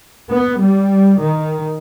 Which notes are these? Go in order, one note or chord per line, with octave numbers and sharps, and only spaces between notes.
B3
G3
D#3